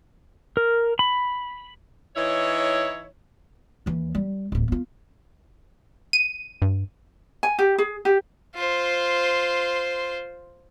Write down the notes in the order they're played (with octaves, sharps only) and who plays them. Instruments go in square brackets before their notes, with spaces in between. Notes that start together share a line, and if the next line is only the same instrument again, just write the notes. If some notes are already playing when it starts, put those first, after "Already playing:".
[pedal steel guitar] A#4
B5
[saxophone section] E3 D#4 E4 C#5
[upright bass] D#2 E3
G3
D1 A1
B3 F4
[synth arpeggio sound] D#7
[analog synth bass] G2
[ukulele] G#5
G4
G#4
G4
[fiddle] F4 C5